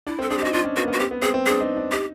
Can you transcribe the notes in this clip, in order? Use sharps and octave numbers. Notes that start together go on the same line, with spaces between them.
D4 E4
C4
A4
D4 G#4
G4
D#4
F#4
D4 F4
C#4
B3 F#4
A#3
B3
F#4
C4 G4
B3
C4 G#4
C4
D4 G#4
D#4
D4
D#4 G4